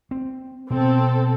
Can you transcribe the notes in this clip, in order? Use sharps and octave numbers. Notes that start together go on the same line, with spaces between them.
C4
B2 C4 A4